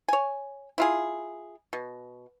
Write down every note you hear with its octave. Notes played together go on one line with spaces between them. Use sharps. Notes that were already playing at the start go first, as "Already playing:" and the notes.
C#5 G#5
E4 F4 G#4
B2